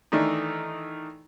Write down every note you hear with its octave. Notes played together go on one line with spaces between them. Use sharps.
D#3 E3 A3 D4 D#4